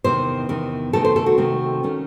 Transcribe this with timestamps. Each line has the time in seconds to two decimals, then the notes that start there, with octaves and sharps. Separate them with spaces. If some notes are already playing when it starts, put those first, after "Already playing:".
0.04 E2 C3 D#3 C5
0.49 E2 C3 D#3
0.93 C3 D#3 A3 C4 A4
1.05 C5
1.16 A4
1.26 F#4
1.38 C3 D#3 A3 C4
1.83 D#3 A3 C#4